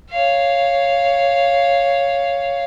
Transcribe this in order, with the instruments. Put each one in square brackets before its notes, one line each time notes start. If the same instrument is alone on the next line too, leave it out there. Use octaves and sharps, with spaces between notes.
[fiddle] C#5 F5